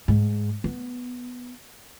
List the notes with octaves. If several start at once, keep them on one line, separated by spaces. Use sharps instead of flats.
G#2
B3